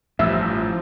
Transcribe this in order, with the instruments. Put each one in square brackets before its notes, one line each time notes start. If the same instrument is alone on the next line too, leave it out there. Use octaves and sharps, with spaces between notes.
[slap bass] A1 G2 [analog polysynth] F3 [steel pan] E5